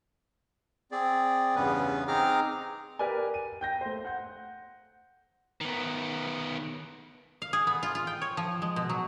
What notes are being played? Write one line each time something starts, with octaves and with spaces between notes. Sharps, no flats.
C4 G#4 D5
E2 G2 C#3 B3 C#4 B4
C4 D#4 G#4 A#5 D6 F6
G4 A#4 B4 D5 G#5
D#7
G5 G6 A#6
A3 C5
F#5 G6
D#3 B3
F5
G#4
B3
F4
F4
G5
C#5
F3
G#3
B2
F#3